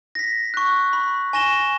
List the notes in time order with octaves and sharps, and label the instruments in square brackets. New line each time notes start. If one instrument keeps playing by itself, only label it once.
[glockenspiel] A#6 B6
C#6 F#6
B5
G#5 C#6 A#6 E7 G7